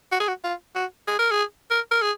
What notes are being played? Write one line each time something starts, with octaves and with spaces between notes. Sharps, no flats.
F#4
G#4
F#4
F4
F#4
G#4
A#4
G#4
A#4
A#4
G#4